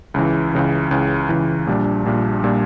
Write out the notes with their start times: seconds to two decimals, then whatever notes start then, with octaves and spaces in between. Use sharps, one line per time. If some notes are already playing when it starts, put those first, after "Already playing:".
0.14 C#2 C#3 E3
0.53 C#2 C#3 E3
0.91 C#2 C#3 E3
1.29 C#2 C#3 E3
1.67 A#1 A#2 G3 D4
2.05 A#1 A#2 G3 D4
2.44 A#2 G3 D4